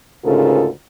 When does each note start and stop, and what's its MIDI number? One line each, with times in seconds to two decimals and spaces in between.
0.24 0.67 38
0.24 0.67 44
0.24 0.67 49
0.24 0.67 65
0.24 0.67 69
0.24 0.67 70